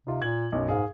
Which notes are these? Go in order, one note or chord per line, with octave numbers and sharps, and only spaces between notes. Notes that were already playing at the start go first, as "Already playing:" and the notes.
C3 D#4 F4
A#2 G#6 F#7
B1 F#2
G#2 G#4 F5